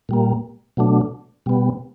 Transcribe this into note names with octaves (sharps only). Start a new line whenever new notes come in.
A#2 G3 A#3
B2 F#3 A3 D4
B2 G3 B3